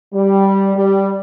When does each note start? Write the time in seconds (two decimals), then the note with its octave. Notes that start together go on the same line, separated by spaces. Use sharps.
0.13 G3
0.75 G3